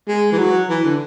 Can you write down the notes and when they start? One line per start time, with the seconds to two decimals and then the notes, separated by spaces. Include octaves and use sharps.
0.08 G#3
0.32 E3
0.38 F#3
0.69 E3
0.84 D3